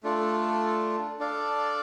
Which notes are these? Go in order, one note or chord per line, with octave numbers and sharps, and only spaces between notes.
A3 D4 F4 A4
D4 A4 D5 F5